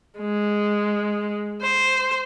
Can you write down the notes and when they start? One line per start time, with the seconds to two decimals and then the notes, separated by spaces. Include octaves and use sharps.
0.19 G#3
1.62 C5